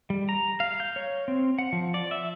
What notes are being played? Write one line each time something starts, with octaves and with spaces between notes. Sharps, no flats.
G3
A#5
F5
G6
C#5
C4
F#5
F3
D5
E5